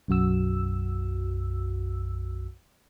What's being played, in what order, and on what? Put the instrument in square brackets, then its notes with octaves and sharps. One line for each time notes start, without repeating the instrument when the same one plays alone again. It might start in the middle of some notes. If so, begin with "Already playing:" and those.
[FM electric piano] B1 F#2 F#4 E6